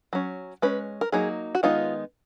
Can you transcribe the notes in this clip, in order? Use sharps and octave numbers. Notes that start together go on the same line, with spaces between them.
F#3 C#4
G#3 C#4 B4
A#4
F#3 A#3 D#4 G#4
F#4
D#3 G#3 B3 D#4 F4